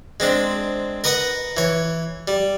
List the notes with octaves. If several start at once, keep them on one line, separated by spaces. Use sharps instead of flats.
G#3 C4 D4
A#4 B4 D#5 F#5 A#5
E3 C#5
G3